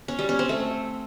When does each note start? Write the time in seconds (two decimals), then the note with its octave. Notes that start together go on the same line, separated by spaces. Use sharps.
0.08 C#4
0.19 G3
0.29 C#4
0.39 C4
0.49 A3